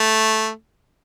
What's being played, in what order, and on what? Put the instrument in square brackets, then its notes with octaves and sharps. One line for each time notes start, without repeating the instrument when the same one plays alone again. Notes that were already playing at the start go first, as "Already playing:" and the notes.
Already playing: [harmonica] A3